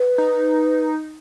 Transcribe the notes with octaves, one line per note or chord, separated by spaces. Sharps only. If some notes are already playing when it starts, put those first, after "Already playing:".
Already playing: B4
D#4